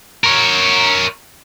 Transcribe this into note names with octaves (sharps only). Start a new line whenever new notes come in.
A#4 C#5